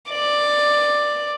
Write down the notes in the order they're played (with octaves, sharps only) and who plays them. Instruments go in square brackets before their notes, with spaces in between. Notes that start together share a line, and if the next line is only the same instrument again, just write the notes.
[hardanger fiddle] D5